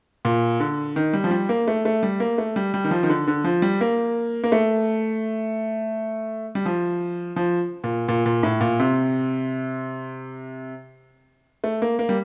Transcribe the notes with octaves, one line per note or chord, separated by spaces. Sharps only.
A#2
D3
D#3
G3
F3
G3
A#3
A3
A3
G3
A#3
A3
G3
G3
D#3
F3
D#3
D3
D3
F3
G3
A#3
A#3
A3
G3
F3
F3
A#2
A#2
A#2
A2
A#2
C3
A3
A#3
A#3
G3